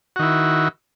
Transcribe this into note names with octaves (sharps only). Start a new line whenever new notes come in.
D#3 E4 F#4